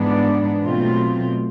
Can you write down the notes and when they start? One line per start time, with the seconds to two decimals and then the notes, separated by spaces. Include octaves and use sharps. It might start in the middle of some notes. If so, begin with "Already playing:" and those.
Already playing: G#2 E3 G#3 B3 D4
0.63 B2 F#3 A3 C4 F4